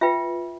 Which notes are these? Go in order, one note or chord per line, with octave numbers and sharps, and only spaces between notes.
F4 B4 E5 G5